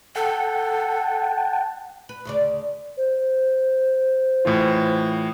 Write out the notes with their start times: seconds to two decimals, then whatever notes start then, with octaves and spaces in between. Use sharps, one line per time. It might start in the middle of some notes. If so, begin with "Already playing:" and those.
0.15 A4 F#5 G5 A5
2.09 B4
2.25 D2 C#3 D5
2.97 C5
4.45 A2 E3 F4